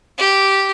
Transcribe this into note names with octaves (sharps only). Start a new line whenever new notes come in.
G4